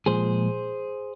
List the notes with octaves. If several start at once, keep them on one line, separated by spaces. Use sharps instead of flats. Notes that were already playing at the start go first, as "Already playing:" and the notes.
A#2 F3 G#3 G#4 C5